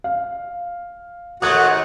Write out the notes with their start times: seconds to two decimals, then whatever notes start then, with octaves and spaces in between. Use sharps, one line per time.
0.04 F5
1.42 D#2 G#2 A3 F#4 F#5 D#6 G#6